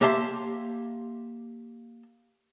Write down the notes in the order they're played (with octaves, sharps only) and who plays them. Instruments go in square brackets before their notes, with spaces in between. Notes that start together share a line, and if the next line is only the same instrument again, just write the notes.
[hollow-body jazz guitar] A#3 G4 E5 A5 C6